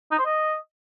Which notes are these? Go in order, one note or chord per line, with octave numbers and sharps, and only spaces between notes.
D#4
C5
D#5